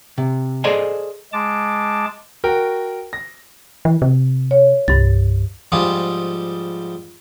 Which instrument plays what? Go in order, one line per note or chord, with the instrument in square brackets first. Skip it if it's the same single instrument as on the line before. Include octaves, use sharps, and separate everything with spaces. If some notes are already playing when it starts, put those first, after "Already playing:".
[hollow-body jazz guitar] C3
G#4 A4 C5 D5 D#5 G#5
[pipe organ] G#3 A5 D6
[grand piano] F#4 A#4 G5
A#6
[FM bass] E3
C3
[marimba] C#5
[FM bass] C2 [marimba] G2 A6
[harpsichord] G#2 F3 G3 F4 G#4